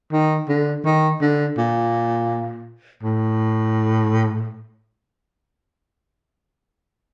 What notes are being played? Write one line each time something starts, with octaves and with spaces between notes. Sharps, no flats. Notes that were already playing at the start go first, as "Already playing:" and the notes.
D#3
D3
D#3
D3
A#2
A2